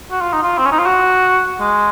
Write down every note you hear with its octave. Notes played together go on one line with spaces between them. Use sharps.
F#4
F4
D#4
F4
C4
C#4
D#4
F4
F#4
G#3